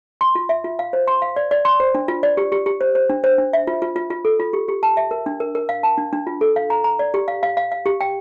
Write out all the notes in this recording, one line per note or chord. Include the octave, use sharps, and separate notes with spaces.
C6
F4
E5
F4
F5
C5
C6
F5
D5
D5
C6
C5
D4
F4
D5
G4
G4
G4
C5
C5
D4
C5
D4
E5
F4
F4
F4
F4
A4
F4
G4
G4
A5
E5
A#4
D4
A#4
A#4
F5
A5
D4
D4
F4
A4
F5
A#5
A#5
D5
G4
F5
F5
F5
F5
G4
G5